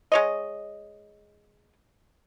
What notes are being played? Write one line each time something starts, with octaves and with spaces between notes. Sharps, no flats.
G#3 C#5 D#5